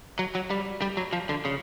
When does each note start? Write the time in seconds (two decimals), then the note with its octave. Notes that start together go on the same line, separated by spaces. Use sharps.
0.19 F#3
0.35 F#3
0.50 G3
0.82 G3
0.97 F#3
1.13 F3
1.29 D3
1.45 C#3